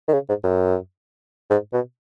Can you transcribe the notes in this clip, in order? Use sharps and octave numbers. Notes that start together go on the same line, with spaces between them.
D#3
C#3
G#2
F#2
G#2
B2